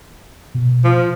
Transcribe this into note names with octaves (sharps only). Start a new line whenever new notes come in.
B2
F3